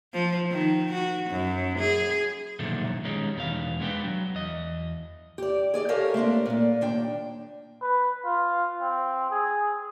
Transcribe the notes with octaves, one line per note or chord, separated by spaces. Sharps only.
F3
D#3
F#4
F#2
G#4
B1 A#2 D3 D#3 F3 A3
D#3 G3 G#3 C#4 D#4
E2 B2 D#3 F5
G#3 B3 D4 B4 G5
F#3
E2 D#5
G4 D5
G#4 D5 D#5
G4 A4 A#4 C#5 F5 G#5
A3 A#3 C4 D4
G2 A#2
D#2 D4 G5
B4
F4
C4
G#4